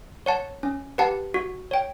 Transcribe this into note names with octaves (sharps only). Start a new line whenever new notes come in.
C#5 F#5 A5
C#4
G4 B4 F#5 A5
F#4
C#5 G5